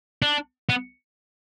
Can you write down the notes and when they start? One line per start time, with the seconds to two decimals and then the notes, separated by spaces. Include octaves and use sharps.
0.22 D4
0.69 B3